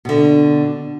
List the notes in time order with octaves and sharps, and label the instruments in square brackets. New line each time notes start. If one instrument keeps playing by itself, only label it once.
[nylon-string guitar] B2 D3